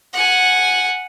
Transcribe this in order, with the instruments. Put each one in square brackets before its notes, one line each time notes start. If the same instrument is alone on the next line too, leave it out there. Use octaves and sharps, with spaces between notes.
[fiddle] F#5 G#5